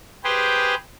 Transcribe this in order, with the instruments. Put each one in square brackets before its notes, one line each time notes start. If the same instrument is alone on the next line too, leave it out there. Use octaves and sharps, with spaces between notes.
[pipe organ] G4 G#4 B4 C5 G5